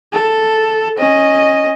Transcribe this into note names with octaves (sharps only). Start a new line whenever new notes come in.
A4
C#4 D#5